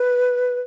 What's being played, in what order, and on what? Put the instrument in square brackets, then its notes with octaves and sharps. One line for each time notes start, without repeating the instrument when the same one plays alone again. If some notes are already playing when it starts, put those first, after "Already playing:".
Already playing: [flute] B4